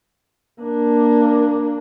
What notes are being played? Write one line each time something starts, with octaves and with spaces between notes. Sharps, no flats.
A#3 D4